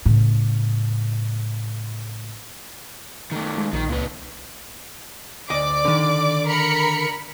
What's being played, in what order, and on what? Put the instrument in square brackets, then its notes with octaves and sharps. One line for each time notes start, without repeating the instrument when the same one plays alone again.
[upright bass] A2 C#3
[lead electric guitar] D#3 A3
[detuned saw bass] G#3
[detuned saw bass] A#1 [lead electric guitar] D#3
[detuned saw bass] C#2 [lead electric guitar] A#2 B4
[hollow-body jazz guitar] D2 D#5 [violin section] D5 D6
[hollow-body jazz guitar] D3 D#3
[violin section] A#4 B5 C#7